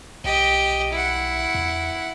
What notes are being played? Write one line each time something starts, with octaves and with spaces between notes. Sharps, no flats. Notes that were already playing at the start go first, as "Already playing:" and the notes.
B1 G4 D#5
E4 F#5
E2